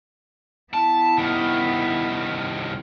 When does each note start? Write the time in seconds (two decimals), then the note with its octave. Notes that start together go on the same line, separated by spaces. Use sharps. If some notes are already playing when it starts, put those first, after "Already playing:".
0.73 B3 E4 A5
1.18 C2 D#3